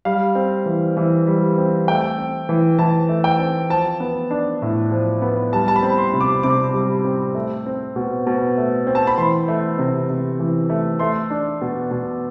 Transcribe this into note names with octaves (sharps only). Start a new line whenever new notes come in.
G3 F5
C4
E3
E3
G3
C4
A3 G5
C4
E3
E3 A5
A3
G5
C4
F3 A5
B3
D4
A2
F3
B3
G3 A5
A5
B5
C4
C6
C3
D6
C3 D6
G3
C4
A3
C4
B2
B2
A3
C4
A5
B5
E3 C6
A3
C3
C3
E3
A3
A3 C6
D4
B2
B2